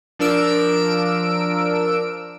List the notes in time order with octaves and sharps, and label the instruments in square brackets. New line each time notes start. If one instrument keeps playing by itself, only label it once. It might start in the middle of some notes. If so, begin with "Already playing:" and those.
[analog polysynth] F3 D4 A#4 E6 D7